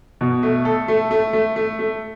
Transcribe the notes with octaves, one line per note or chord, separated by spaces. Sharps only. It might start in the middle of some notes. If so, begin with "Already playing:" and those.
B2
A3
A4
A3
A3
A3
A3
A3